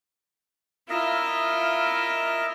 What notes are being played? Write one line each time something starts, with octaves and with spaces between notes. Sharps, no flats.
E4 F4 A#4 D#5 E5